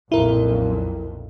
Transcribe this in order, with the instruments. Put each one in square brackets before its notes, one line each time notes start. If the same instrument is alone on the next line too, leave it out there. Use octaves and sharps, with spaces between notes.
[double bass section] B1 F2 A#2 [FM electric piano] E4 A#4